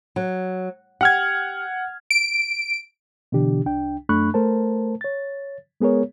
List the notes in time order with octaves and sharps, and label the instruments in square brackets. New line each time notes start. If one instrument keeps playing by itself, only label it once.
[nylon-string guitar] F#3
[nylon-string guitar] G4 [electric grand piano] F#5 F6 G#6
[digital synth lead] D7
[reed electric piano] B2 D3 E3 D4 G4
C2 D4 G5
F#2 A3 D4 B5 C#6 F#6
A3 A#4 C5 A5
C#5 A6
G#3 B3 G#4 A#4 C#5